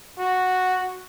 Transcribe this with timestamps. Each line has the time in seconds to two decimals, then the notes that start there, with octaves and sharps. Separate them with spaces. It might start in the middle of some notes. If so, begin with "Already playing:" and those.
0.19 F#4